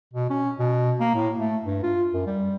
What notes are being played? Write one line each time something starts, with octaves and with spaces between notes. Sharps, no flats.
B2
C#4
B2
A#3
A2
A3
G2
F4
F#2
G3